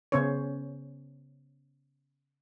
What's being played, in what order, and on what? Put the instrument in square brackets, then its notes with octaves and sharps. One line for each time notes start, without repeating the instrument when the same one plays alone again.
[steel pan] C#3 B3 C#4 C5 C#5